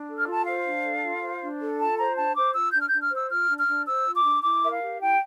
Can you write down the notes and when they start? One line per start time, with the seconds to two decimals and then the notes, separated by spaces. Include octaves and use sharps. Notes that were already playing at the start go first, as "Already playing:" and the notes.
Already playing: D4
0.09 A4
0.17 F6
0.27 F4
0.32 A5
0.46 C5 F5
0.65 D4
0.84 A4
1.02 F4
1.21 C5
1.41 D4
1.60 A4
1.79 F4 A5
1.97 C5 A#5
2.16 D4 A5
2.35 C5 D6
2.54 F4 E6
2.72 D4 G6
2.81 F6
2.88 D4 G6
3.01 F6
3.11 C5
3.16 E6
3.30 F4 F6
3.48 D4
3.58 F6
3.67 D4
3.86 C5 E6
4.06 F4
4.15 D6
4.24 D4
4.43 E4 D6
4.63 A#4 E5
4.71 F5
4.81 G4
5.00 E4 G5